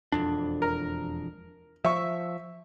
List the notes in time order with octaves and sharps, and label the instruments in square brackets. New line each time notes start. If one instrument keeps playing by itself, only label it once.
[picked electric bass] E1 F2 D4
[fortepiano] A#4
[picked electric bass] F3 [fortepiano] E5 C#6